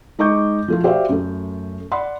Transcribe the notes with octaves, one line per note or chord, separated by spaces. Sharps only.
G#3 D#4 D#5 C#6 D6 G6
F3 A3 F4
F#4 G4 C5 D5 E5 F5
F#2 A3
D5 F#5 B5 C6